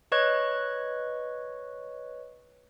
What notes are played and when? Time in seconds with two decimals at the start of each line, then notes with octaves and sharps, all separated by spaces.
0.12 B4 C#5 D#5 C#6 F#6 G#6